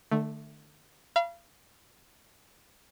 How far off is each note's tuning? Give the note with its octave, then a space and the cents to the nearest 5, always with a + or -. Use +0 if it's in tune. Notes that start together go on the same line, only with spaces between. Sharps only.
D3 +35 A3 +0
F5 -35 B5 -30